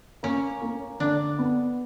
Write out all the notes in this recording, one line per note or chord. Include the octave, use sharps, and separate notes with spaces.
A#3 C#4
A#3
D3 D4
B3